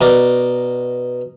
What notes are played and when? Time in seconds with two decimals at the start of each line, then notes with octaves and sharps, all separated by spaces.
0.01 B2 A#4 D5